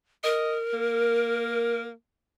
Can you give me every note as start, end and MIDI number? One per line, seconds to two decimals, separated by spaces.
0.24 1.82 70
0.24 0.56 75
0.73 1.92 58